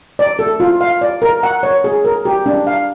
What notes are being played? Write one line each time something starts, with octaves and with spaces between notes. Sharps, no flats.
D5
A4
F4
F5
D5
A#4
F#5
C#5
G#4
A#4
G4
D4
F5